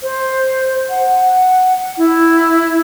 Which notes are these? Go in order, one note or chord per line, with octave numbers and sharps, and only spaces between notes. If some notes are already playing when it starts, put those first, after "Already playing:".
C5
F#5
E4